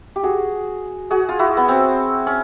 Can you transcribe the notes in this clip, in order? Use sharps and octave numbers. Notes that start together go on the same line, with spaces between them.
G4
F#4 G#4
F#4 G#4
F4
E4 F#4
B3
C4
C#4